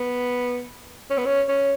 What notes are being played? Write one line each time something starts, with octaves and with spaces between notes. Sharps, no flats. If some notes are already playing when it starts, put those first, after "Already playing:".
Already playing: B3
C#4
B3
C#4
C#4